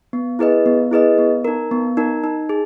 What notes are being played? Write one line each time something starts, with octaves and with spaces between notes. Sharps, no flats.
B3
E4 G#4 B4 D#5
B3
E4 G#4 B4 D#5
B3
D#4 A#4
B3
D#4 A#4
D#4
G#4